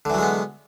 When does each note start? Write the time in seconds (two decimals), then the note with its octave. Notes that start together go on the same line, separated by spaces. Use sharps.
0.05 D3
0.10 E3
0.14 F#3
0.18 G#3
0.23 B3